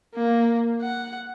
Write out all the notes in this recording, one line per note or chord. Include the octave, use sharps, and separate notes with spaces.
A#3
F#5